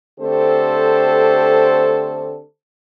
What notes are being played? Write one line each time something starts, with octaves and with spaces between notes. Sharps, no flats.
D3 A3 C4 G4 A4 C5